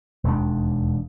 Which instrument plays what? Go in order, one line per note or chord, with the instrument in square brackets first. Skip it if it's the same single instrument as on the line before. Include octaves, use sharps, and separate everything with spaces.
[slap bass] E1 D#2 G#3 D4